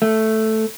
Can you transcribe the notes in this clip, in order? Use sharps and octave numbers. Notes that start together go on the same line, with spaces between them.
A3